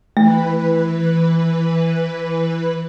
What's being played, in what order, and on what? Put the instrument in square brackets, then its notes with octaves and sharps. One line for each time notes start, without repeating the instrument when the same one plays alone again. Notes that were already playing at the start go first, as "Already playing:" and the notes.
[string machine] E3 B4 [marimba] A3